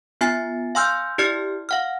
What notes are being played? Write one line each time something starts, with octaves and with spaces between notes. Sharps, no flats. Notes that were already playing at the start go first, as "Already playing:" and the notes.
B3 F4 G#5 A6 C7
F5 G#5 C6 E6 F6 G6
E4 G4 D5 F6 C7
F5 F#5 F6